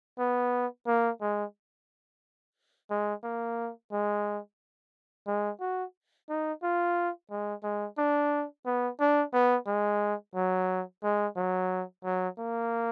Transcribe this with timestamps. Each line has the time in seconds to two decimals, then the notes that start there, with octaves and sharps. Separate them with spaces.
0.19 B3
0.87 A#3
1.21 G#3
2.90 G#3
3.23 A#3
3.92 G#3
5.27 G#3
5.60 F#4
6.29 D#4
6.63 F4
7.31 G#3
7.64 G#3
7.98 D4
8.66 B3
9.00 D4
9.33 B3
9.67 G#3
10.35 F#3
11.03 G#3
11.36 F#3
12.04 F#3
12.39 A#3